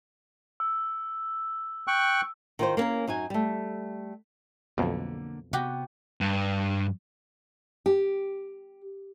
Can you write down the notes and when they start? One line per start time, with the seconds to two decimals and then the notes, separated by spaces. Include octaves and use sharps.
0.60 E6
1.87 G5 C#6 F#6
2.59 D#3 F4 C5
2.77 A#3 B3 C#4 G#4 A#4
3.07 F#2 D#4 F#4 G#5
3.30 G3 A3
4.78 B1 F2 D3 A#3
5.53 C3 B3 F#4 G4
6.21 G2
7.86 G4